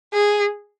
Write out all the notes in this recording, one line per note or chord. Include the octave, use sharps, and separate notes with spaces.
G#4